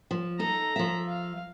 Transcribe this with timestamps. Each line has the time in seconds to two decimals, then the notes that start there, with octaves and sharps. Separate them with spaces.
0.11 F3
0.39 D#4 A4 A#5
0.76 F3 E5
1.08 F5